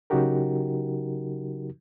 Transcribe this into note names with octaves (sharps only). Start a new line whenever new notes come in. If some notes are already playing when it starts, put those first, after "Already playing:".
C#3 F#3 D#4 F#4 G4 A#4